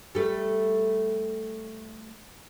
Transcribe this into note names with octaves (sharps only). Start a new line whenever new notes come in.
G3 A3